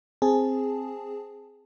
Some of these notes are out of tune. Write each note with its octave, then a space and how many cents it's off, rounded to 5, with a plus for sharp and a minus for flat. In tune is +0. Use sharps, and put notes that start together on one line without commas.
C4 +0 G#4 +0 A5 +0